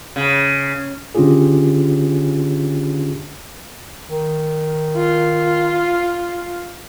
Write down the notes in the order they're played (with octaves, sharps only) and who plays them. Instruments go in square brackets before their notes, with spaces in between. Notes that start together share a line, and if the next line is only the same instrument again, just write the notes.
[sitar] C#3
[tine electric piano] D3 C#4 D4 F4 G4 G#4
[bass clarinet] D#3
[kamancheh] F4